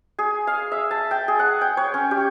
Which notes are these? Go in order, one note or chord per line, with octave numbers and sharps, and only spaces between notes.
G#4
F5
E5
A5
G5
G#4
F#5
G5
C#5
C#4
G4